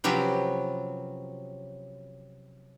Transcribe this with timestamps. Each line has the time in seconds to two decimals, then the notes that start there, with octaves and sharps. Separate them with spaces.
0.04 C3 F3 F#3 C#4 G4 B4